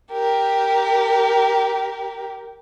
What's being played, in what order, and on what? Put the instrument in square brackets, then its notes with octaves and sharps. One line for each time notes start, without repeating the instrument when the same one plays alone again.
[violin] G4 A#4